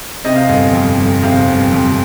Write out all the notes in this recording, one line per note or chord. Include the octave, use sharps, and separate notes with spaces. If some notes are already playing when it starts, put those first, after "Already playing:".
C3 D#5
F5
G1 D#5
F2
G1
C3 F5
G1
F2